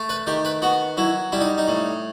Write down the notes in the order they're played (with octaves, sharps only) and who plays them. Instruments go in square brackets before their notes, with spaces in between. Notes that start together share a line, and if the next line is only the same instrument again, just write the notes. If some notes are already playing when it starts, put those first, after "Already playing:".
Already playing: [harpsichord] A3
B4
D#3 G4
B4
B3 F#4
F#3 E4
G3 E4
D#4
D#4
A2